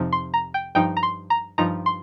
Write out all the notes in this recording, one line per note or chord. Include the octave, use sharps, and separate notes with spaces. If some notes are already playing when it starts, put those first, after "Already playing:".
Already playing: F2 C3 F3 D#4
C6
A#5
G5
G2 F3 D#4 G5
A#5
C6
A#5
G2 F3 D#4 A#5
C6